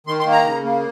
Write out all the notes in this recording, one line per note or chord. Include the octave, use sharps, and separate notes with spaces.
D#3 C6
C6
A#3
A#5
C#3
A#3